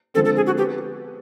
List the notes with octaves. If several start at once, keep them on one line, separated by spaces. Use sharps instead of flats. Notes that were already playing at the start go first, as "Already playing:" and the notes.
D3 F3 G#3 C4 A4
A4
G#4
F#4
B3 G4